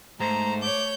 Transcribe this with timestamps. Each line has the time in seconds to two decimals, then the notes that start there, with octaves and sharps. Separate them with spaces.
0.20 G#2 A3 C5 A#5
0.62 C#5 D6 G6